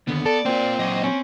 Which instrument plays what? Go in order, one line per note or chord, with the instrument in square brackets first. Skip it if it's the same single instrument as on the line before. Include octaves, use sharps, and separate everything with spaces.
[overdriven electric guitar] D#2 D3 [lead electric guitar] B3
[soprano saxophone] A4 [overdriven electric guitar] D5
[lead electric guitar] A#3 F4 [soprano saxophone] C4
[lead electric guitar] A#2 F#3 [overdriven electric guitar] D#5
[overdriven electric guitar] C4 [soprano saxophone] C#4